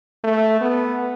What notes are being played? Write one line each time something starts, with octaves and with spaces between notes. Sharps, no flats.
A3
B3